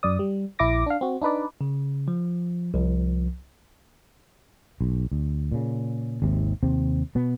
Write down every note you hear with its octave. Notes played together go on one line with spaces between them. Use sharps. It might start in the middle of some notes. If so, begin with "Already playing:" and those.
F#2 D5 D#6
G3
A#1 E4 D6 A#6
D4 F5
C4 F#4
D4 D#4 B4 D5
C#3
F3
C2 F3
B1
D2
A#2 C#3
G#1 D#2 C3
D#2 C3 C4
B2 B3